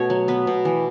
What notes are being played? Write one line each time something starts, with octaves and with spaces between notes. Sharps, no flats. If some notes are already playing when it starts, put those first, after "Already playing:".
Already playing: B2 A3 C#5
F#3
B3 B4
B2
E3